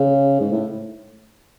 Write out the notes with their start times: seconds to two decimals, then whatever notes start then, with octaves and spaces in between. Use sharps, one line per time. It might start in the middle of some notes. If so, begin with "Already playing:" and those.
Already playing: C#3
0.40 G#2
0.52 A2